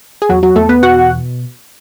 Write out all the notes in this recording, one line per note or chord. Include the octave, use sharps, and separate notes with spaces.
G#4
E2 F#3 F#4
F#3 F#4
E2 A3 A4
B3 B4
B2 F#4 F#5